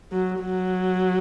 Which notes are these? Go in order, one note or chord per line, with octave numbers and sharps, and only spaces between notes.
F#3
F#3